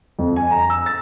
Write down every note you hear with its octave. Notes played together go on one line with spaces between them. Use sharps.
F2
G#5
A#5
E6
A6